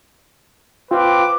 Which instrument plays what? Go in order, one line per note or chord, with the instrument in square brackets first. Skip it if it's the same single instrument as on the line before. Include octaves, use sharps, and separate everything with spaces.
[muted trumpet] C4 [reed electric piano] F4 F5 [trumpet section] B4 D6